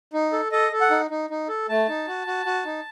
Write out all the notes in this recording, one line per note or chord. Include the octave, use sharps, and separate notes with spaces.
D#4
A4
A4 D#5
A4
F#5
D#4
D#4
D#4
A4
A3 A5
D#4
F#4
F#4
F#4
D#4